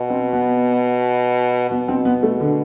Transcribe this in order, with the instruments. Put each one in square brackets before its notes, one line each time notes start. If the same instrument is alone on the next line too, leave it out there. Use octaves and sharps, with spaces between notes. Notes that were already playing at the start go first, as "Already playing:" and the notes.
Already playing: [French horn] B2
[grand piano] C4
B3
[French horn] B2 [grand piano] B3
[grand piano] C4
B3
A3
D3